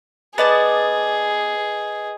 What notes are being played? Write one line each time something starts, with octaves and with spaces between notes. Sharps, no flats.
B3 G#4 B4 D5 D#5 A5 A6